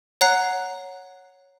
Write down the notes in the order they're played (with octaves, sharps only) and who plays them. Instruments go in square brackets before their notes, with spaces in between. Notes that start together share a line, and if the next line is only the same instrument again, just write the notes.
[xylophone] C#5 F#5 A#5 F#6 C7